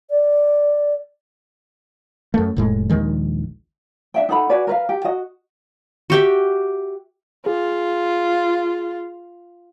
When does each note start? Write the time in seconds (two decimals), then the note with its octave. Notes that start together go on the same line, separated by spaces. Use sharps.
0.10 D5
2.34 F#2 A3
2.56 F1 A2 G#3
2.90 A#1 D#2 D#3 G#3
4.14 D4 E5 G5
4.29 D#4 A4 F#5 B5
4.49 F#4 G#4 B4 D5
4.67 A#4 B4 F5
4.89 G4
5.04 F#4 D#5
6.10 F#4 G4 E5
7.46 F4 G#4